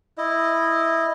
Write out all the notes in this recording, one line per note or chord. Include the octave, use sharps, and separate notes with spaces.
E4 D#5